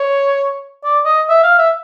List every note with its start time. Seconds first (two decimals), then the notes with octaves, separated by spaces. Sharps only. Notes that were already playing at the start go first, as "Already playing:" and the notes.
Already playing: C#5
0.84 D5
1.05 D#5
1.29 E5
1.43 F5
1.58 E5